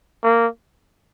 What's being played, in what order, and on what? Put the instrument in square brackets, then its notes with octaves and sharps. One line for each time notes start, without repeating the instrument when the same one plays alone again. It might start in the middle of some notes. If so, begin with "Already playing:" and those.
[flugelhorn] A#3